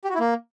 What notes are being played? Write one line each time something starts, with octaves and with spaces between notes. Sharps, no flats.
G4
F#4
E4
A#3